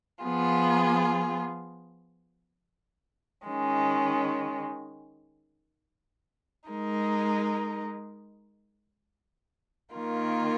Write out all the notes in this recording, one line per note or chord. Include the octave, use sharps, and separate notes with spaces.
F3 B3 F4 G#4
D#3 G#3 C#4
G#3 D#4 A#4
D#3 A#3 F4 A#4